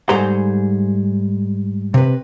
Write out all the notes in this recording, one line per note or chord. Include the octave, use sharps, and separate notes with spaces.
G#2 G3 A3 G#4 C5 A#5
C3 B4